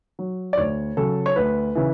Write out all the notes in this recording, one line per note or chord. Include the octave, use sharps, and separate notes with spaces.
F#3
D5
D2 C#5
C#3 F#3 A4
C#5
D2 B4
C#3 E3